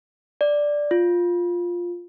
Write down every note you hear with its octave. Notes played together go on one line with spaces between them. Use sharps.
D5
F4